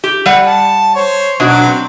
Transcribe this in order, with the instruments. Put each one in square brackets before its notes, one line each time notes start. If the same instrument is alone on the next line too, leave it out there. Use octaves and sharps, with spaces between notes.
[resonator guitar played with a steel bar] G4
G3 F#5
[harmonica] A5
C5 C#5
[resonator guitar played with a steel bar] B2 D4 F#4 [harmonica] F#3
[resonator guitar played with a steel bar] C4